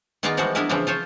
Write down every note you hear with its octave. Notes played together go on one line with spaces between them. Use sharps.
D#3 B3 F4 G#4 D5 A#5
E3 F3 G3 G#3 F#4
B3 D4 E4 A#4 B4
C#3 E3 F3 C4 D4
F4 C5 C#5